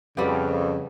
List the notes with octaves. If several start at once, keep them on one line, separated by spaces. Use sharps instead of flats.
F2 C#3 G3 B3 G4